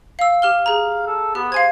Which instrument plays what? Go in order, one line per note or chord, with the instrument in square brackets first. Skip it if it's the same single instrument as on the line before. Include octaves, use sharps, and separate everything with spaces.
[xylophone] F5 E6
[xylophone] G4 F6 G7 [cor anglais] F5
[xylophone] G#4 A#5
[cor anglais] A4
[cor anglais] B3 [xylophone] G4
[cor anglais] C5 [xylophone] F5 G#5 G#6